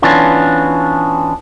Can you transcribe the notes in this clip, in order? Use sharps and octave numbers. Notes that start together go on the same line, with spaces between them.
E3 B3 C#4 D4 F4